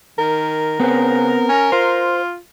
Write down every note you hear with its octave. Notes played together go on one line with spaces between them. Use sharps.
D#3 A#4
C#3 B3 C4
C#4
F4 C5